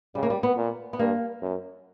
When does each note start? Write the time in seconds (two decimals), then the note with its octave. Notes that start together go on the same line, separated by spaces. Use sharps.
0.15 C#3 G3
0.23 A#3
0.30 G3
0.43 B3
0.57 A#2
0.93 B3
0.99 G2 A#3
1.42 F#2